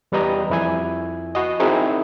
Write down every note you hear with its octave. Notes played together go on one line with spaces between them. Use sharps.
E2 G3 B4 D#5 A#5
F2 E4 G#5
F#4 D#5
C4 D#4 E4 G#4 A#4